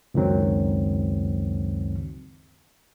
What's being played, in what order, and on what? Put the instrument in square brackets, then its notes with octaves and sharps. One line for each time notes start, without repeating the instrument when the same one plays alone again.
[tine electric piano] C#2 F#2 D#3 F#3 C4